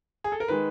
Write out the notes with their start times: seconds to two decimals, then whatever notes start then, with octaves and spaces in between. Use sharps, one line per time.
0.24 G#4
0.32 A4
0.40 A#4
0.48 D#3 G#3 B4